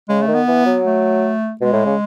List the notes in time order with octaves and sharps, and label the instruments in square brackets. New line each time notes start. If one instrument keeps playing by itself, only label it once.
[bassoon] C#3 [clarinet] G#3
[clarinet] A3
[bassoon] D#3
[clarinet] B3
[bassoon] E3
F#3
[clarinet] A3
[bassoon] B2 [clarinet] G#3
[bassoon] A2
C#3